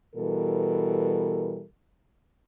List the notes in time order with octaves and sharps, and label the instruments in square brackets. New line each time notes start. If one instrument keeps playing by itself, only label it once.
[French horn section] B2 E3 G3 A4 A#4